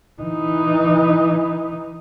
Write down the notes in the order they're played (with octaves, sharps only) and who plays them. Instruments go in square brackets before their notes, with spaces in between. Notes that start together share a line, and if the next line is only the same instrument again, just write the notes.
[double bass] E3 D#4